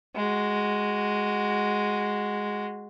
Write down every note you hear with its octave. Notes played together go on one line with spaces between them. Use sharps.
G#3 F#4